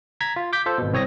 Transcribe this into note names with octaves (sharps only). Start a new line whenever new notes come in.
A#5 G#6 B6
F4
D6 G6 B6
F4 A4 C5
G#1 B2
C2 C4 C#5 D#6 A#6